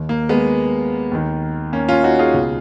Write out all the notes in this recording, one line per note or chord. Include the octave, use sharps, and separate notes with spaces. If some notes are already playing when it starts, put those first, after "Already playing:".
Already playing: D#2 D#3
A#3
G#3 B3
D#2 D#3
A#3 C#4
C#4 F4
D#4 F#4
F4 G#4
C#2 B2